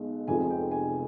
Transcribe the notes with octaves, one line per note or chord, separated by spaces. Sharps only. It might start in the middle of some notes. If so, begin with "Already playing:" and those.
Already playing: B1 B2 G#3
F1 F2 C3 F3 G#3 G#5
G5
G#5